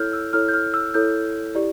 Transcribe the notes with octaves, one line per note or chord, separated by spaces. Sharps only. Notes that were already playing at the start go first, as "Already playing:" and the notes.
Already playing: E4 A4 C#5 F6 G6
E6
E4 A4 C#5 F6
G6
F6
E6
E4 A4 C#5 G6
E4 G4 D5